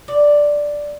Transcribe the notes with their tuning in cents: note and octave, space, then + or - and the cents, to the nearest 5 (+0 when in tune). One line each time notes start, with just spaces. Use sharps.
F4 +45 D5 +0